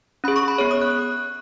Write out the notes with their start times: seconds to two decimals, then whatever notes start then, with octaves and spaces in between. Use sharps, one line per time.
0.24 C#4 G#4 B5
0.36 C#6
0.48 B5
0.58 B3 G#4 C#5
0.71 D#6
0.81 F#6